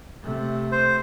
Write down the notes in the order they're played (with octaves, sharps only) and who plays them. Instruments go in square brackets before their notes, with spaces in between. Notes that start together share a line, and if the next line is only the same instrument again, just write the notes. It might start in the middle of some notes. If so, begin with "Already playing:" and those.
[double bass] C3 A3
[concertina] C5